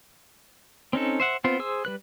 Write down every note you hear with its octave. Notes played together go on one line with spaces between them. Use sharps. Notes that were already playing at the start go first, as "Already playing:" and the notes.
C4 C#4 D#4 A4
C5 E5 F#5
B3 C4 F4 C5
G#4 C5 E6
G3 B4 F#6